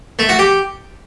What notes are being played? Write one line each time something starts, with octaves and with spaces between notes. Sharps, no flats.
A3
F#4
G4